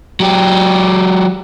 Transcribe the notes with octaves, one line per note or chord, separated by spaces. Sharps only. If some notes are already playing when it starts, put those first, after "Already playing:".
F#3 G4